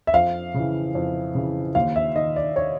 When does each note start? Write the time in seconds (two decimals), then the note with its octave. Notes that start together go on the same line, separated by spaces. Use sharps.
0.07 E5
0.13 F2 F5
0.54 C#3 E3
0.95 F2
1.35 C#3 E3
1.75 D#2 F5
1.96 E5
2.16 D#3 D#5
2.36 D5
2.56 C#5